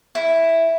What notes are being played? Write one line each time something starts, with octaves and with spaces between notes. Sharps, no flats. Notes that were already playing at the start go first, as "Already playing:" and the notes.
E4